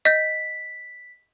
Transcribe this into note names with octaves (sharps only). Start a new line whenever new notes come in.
D#5 G6 B6